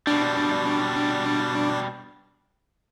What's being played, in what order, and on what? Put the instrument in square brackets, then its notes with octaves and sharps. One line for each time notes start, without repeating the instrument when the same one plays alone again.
[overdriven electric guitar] B2 G3 [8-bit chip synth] D4